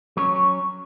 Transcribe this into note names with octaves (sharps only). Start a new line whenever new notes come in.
F#3 C#4 C#5